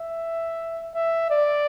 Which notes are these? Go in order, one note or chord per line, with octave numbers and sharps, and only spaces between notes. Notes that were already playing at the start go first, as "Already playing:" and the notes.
Already playing: E5
E5
D5